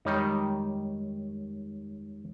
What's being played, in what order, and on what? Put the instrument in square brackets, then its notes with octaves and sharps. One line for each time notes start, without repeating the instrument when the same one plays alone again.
[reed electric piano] F2 G#3 C#5 [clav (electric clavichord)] D#3 G3 D#4